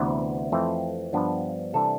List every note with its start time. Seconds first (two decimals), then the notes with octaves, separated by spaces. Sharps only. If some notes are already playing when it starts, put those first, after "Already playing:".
Already playing: D2 C3 E3 B3
0.52 F2 E3 A3 C4
1.13 G2 F3 B3 D4
1.73 C3 E3 G3 D4 A4